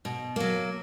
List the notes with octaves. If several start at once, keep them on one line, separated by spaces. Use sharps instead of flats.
B2
F#3 A#3